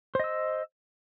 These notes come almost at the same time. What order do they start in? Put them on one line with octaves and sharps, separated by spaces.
C5 D#5 E6